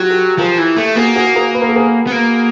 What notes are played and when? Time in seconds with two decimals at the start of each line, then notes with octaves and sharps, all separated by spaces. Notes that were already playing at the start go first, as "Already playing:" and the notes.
Already playing: F#3 F4 G4
0.10 G4 A4
0.39 F3 G#4 A#4
0.59 E3
0.77 A3
0.96 A#3 F#4 G#4
1.16 F#4 G#4
1.35 G#4 A#4
1.54 B4
1.62 A#4
1.69 A4
1.76 G#4 A#4
2.07 B3
2.12 A#3